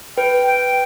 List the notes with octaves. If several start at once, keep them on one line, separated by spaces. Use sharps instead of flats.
B4 G5
G5